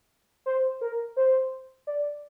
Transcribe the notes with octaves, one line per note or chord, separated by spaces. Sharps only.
C5
A#4
C5
D5